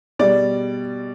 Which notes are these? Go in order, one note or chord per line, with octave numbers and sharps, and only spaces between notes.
B2 G3 D5